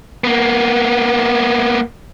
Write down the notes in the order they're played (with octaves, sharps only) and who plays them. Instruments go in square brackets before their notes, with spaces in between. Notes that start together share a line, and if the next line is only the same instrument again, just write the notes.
[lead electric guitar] A#3 B3